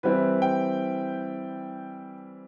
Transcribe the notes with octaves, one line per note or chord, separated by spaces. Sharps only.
E3 G3 C4 E4 B4
G5